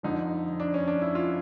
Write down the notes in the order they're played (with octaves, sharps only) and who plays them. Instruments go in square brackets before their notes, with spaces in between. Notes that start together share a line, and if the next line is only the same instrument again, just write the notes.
[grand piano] F2 D3 F3 D#4
D4
C#4
D4
E4
F4